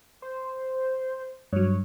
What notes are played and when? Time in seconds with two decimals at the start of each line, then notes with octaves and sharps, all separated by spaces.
0.22 C5
1.53 G2 F#3 C#5